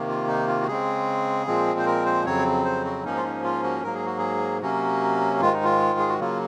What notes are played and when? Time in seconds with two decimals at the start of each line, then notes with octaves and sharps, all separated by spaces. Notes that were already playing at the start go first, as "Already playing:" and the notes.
Already playing: C3 D#3 A#3
0.09 F4
0.27 D#4
0.47 F4
0.61 F#4
0.67 C#3 G#3 C4 G#4
1.46 A#2 F3 G#3 C4
1.79 C5
1.86 A#4
2.06 C5
2.25 F2 C#3 F#3 C4 C#5
2.65 C5
2.85 F#4
3.04 G#2 F3 A#3 C#4 D#4
3.17 F4
3.23 D#4
3.44 F4
3.63 F#4
3.83 G#2 F#3 A#3 A#4
3.94 G#4
4.06 F#4
4.18 G#4
4.62 C3 F#3 A#3 C#4 F#4
5.41 G#2 D#3 G#3 F4
5.53 D#4
5.64 F4
5.99 G#4
6.09 F#4
6.20 C#3 F#3 A#3 F4